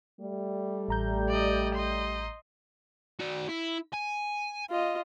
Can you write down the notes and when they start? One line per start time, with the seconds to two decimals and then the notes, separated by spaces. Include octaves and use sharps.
0.20 G3 A3
0.88 A1 A#5 G6
1.29 D5 D#5
1.74 D#5 C6
3.19 F#4 D5
3.49 E4
3.94 G#5
4.70 F4 D#5